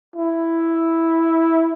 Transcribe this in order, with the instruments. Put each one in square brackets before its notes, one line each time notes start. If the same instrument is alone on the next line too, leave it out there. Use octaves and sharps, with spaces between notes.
[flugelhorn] E4